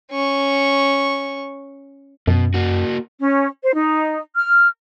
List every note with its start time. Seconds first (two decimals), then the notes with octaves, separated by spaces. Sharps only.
0.11 C#4 C#6
2.27 F#2 B2
2.54 A#3 F#4
3.19 C#4
3.63 C5
3.76 D#4
4.36 F6